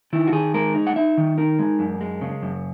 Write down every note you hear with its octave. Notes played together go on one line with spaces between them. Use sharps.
D#3 E4
F#4
D#3 G#4
G#3 A#4
D#4
F#5
D#4 E5
D#3
D#4 A#4
G#3
F#2
G#3
C#3
F#2